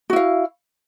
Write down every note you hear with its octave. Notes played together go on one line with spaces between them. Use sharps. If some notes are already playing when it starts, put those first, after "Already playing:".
E4 F#4 F5